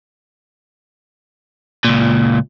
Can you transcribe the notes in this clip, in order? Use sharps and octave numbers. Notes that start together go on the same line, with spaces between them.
C#2 A#2